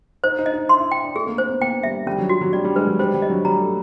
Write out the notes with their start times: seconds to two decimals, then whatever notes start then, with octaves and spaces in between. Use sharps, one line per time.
0.24 D#4 C5
0.39 D#4
0.46 D#5
0.53 D#4
0.69 E4 C6
0.80 E4
0.92 G5
1.04 D4
1.15 A3 G#4
1.27 A#3
1.38 C4 C5
1.49 B3
1.61 A#3 G5
1.83 G3 E5
2.06 G3 C#4
2.18 F#3
2.29 F#4
2.41 F#3
2.53 G3 D5
2.65 G3
2.76 G#3 B4
2.87 F#3
2.99 G3 C5
3.14 G3
3.22 D#5
3.30 F#3
3.45 G3 A#5
3.60 A3